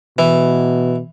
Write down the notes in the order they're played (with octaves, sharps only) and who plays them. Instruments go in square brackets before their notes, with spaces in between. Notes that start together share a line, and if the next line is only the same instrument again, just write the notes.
[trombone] B2 [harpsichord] E3